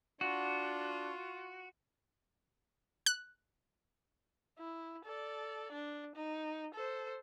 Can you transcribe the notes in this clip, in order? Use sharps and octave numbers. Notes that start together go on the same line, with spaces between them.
D4 F4 F#4
F#6
E4
A4 D5
D4
D#4
A4 C5